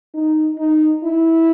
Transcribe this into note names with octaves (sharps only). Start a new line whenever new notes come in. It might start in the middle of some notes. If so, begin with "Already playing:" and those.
D#4
D#4
E4